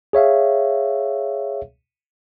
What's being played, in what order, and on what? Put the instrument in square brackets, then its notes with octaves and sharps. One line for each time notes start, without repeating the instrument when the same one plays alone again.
[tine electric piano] G#4 C#5 E5 F5